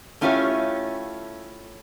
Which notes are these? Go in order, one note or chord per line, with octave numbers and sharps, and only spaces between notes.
A3 C#4 E4 F4 G4 C#5